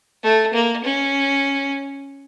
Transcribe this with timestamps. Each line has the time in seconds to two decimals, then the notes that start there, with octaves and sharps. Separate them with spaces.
0.23 A3
0.54 A#3
0.84 C#4